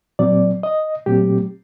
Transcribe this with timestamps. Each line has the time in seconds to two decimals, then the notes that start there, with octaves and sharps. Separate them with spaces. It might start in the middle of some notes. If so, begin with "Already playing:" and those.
0.19 A#2 F#3 C4 D5
0.63 D#5
1.06 A#2 F#3 A3 C4 G4